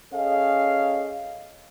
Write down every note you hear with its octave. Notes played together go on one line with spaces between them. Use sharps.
C#4 G#4 A4 D#5 F5